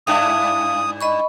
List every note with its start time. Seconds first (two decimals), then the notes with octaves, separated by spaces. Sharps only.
0.07 G2 D4 E4 F5 D#6
1.01 D#5 B5 C#6